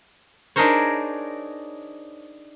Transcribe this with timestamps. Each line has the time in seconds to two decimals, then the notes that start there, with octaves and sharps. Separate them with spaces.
0.56 D4 D#4 G#4 A#4 C5 C#5